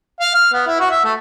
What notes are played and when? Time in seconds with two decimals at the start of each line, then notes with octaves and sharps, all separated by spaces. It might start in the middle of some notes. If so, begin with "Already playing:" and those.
0.21 F5
0.35 F6
0.53 B3
0.67 E4
0.80 F#4
0.91 E5
1.04 A3